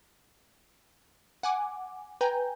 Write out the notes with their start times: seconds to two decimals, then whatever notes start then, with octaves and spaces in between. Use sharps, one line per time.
1.43 F#5 G#5 D6
2.21 B4 G5 G#5 A#5 G6